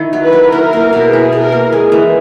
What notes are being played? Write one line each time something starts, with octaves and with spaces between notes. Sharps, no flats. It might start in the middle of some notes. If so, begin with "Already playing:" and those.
Already playing: D#3 E4
F#3
B4
F#3
E4 A#4
A#3
B2
E4 G#4
B2
A#4
A#3
G#3 G#4
E3